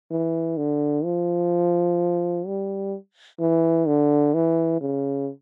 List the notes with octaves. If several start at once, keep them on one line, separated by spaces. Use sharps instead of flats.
E3
D3
F3
G3
E3
D3
E3
C#3